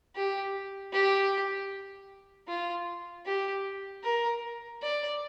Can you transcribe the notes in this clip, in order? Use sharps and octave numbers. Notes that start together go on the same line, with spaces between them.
G4
G4
F4
G4
A#4
D5